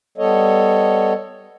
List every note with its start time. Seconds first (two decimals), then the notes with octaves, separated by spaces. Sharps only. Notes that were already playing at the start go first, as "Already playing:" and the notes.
0.18 G3 B3 A4 C#5 D#5